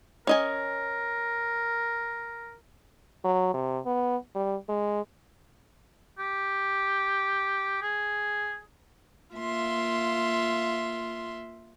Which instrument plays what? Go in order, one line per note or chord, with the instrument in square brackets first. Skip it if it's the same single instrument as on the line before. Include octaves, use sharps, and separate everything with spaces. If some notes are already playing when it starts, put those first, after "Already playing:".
[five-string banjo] C#4 D#5 G#5 [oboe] A#4
[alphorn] F#3
C3
B3
G3
G#3
[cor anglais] G4
G#4
[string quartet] A#3 F4 E5 C6